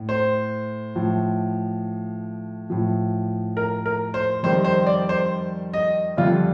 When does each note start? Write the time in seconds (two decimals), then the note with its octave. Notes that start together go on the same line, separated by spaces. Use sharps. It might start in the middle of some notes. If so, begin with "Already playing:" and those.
Already playing: A2
0.09 C5
0.96 A2 F3
2.70 A2 F3
3.57 A#4
3.86 A#4
4.14 C5
4.43 F2 D#3 G3 C5
4.65 C5
4.87 D5
5.09 C5
5.73 D#5
6.17 F2 D3 G3 F4